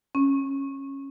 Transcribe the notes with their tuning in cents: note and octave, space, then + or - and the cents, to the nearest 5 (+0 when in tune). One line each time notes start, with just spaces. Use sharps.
C#4 -15